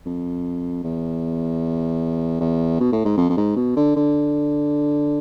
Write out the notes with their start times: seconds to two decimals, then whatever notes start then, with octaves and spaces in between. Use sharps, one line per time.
0.06 F2
0.84 E2
2.41 E2
2.80 B2
2.92 A2
3.05 G#2
3.18 F2
3.29 F2
3.37 G#2
3.56 B2
3.77 D3
3.96 D3